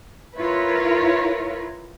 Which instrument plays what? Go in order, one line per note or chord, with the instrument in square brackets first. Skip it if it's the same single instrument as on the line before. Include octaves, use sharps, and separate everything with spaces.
[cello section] E4 F4 A#4 B4 C#5